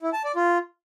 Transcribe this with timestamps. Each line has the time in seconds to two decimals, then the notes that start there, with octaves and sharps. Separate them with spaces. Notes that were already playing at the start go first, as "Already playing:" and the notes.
0.02 E4
0.13 A5
0.24 D5
0.36 F4